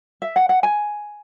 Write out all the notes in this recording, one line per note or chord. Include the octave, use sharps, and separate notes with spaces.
E5
F#5
F#5
G#5